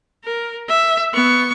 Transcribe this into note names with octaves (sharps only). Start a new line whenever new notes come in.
A#4
E5
B3 C#6